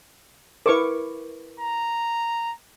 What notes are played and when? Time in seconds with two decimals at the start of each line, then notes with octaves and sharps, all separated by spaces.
0.66 E4 A#4 B4 C#6 D6
1.60 A#5